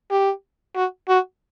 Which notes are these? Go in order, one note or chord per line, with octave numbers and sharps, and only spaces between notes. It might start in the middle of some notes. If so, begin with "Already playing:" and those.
G4
F#4
F#4